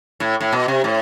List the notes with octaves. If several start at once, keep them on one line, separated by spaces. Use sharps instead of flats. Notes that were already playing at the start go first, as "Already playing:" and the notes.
A2
A2
B2
C3
A2